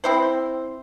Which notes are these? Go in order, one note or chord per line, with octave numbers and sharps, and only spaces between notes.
C4 E4 C5